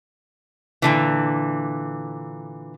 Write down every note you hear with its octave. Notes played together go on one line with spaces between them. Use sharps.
A#2 D3 E3